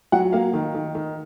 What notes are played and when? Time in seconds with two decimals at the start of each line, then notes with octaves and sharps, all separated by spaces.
0.12 F#3 F#5
0.32 A#3 F5
0.53 D#3
0.75 D#3
0.95 D#3